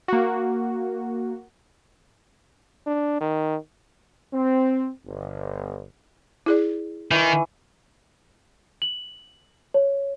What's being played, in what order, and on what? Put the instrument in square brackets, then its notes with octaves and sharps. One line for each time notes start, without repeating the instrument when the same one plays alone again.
[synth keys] A#3 F#4
[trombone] D4
D#3
[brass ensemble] C4
G1
[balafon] E4 G#4 D5
[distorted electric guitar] D#3 [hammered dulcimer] E3 C#6
[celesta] F#7
C#5